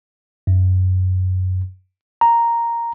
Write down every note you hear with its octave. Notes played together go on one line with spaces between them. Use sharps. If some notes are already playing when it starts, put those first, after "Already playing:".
F#2
A#5